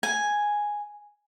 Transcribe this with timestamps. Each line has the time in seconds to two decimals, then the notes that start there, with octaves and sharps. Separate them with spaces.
0.03 G#5